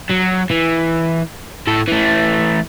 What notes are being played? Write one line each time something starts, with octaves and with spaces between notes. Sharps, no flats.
F#3
E3
A2 A4
E3 A3